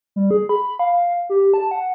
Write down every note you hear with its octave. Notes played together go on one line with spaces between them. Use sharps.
G3
G#4
B5
F5
G4
A5
F#5